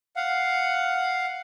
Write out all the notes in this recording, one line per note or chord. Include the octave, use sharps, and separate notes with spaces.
F5 F#5